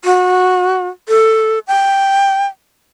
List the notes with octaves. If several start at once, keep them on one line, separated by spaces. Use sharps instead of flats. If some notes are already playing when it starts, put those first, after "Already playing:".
F#4
A4
G5